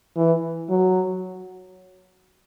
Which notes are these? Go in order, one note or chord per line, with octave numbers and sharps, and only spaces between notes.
E3
F#3